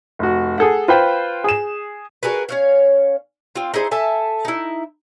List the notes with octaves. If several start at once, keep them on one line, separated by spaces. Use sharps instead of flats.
F1 F#4
G#4 A4 F#5
F4 B4 C5 G5
G#4 E7
F#4 G#4 A#4 B4
C#4 C#5 F5
C4 F4
D#4 E4 G#4 C5
A4 E5 G#5 A5
D#4 E4